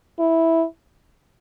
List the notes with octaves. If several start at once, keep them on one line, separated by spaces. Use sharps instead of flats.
E4